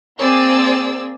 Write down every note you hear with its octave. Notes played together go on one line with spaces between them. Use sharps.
A#3 C4 G#4 D5 E6